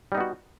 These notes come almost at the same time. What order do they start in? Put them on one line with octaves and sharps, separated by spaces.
G3 D#4 B3 F#4